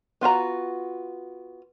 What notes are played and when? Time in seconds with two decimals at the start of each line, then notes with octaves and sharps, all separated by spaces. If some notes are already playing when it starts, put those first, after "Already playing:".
0.21 B3 F4 F#4 A#5